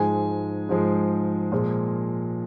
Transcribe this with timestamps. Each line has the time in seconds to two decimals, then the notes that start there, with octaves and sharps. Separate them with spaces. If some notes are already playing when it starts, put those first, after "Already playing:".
Already playing: G#2 F3 G#3 G#5
0.69 G#2 F3 G#3
1.52 A#2 F3 G#3